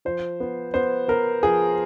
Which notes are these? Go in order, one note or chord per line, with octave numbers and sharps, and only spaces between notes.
F3 C5
B3
B3 C5
B3 A#4
F3 G#4